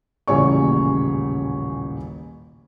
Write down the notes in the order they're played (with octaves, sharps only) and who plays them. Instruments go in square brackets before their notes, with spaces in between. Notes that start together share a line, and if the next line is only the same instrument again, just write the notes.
[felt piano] D#1 A1 C#3 C#5 G#5 C#6